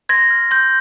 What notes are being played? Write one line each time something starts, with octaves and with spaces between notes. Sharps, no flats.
C6 G#6 A#6
F6
C6 G6